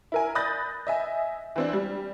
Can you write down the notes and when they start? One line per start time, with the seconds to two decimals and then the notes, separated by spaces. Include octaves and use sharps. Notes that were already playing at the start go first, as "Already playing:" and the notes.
0.12 E4 A#4 G#5
0.35 B5 D#6 F#6 G6 A6 A#6
0.87 D#5 E5 G#5
1.56 E3 C4 D4
1.73 G3